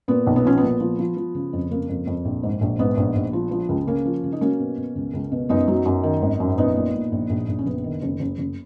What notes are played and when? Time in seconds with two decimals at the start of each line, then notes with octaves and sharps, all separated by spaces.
0.08 A#2 B3
0.27 B1
0.36 B3
0.44 F3 C#4
0.58 B3
0.63 A#2
0.80 F3
0.99 F3
1.17 F3
1.35 C#3
1.53 F2
1.71 C#3 A#3
1.89 F2
2.07 F2
2.25 A#1
2.43 G#2
2.61 A#1
2.79 G#2 B3
2.97 A#1
3.16 A#1
3.33 F3
3.51 F3
3.69 C#2
3.87 C#3 A#3 C#4
4.05 F3
4.24 C#3
4.32 D#4
4.41 F#3 A#3 C#4
4.59 B2
4.78 B2
4.95 C#2
5.14 C#2
5.32 B2
5.49 F#2 B3 D#4
5.68 F#3
5.85 F#2
6.03 D#3
6.22 G#1
6.40 F#2
6.58 A#1 B3 D#4
6.76 A#2
6.94 A#2
7.12 A#1
7.30 A#1
7.48 A#1
7.59 C#4
7.66 F#1 B3
7.84 D#3
8.02 F#1
8.20 F#1
8.38 F#1